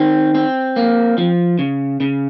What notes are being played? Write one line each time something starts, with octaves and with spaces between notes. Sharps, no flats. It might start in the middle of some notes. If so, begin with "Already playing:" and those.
Already playing: D#3 C4
C4
A#3
F3
C#3
C#3